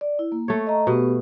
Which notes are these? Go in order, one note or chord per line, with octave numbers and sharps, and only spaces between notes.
D5
E4
A#3
A3 C#5
D#5 A#5
B2 B3 G4